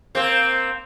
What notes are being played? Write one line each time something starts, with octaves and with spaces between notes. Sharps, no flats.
A#3 C4